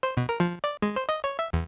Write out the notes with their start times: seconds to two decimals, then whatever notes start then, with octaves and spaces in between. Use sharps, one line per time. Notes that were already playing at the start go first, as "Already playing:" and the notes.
0.03 C5
0.17 B2
0.29 A#4
0.40 F3
0.64 D5
0.82 G#3
0.96 C5
1.09 D#5
1.24 C#5
1.39 E5
1.53 E2